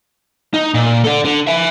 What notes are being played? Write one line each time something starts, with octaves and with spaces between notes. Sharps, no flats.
D#4
A#2
A4 D5
D3
E5 G#5